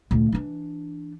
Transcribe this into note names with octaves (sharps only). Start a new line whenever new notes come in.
D2 A#2
E3 D4